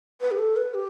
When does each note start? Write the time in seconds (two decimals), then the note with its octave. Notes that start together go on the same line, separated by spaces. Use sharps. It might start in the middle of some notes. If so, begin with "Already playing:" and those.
0.21 B4
0.31 G4
0.39 A4
0.57 B4
0.74 G4